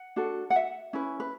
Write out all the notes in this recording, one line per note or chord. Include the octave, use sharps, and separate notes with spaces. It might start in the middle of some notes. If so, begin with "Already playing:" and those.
Already playing: F#5
D4 F#4 A4
F#5
E5
C#4 E4 B4
B4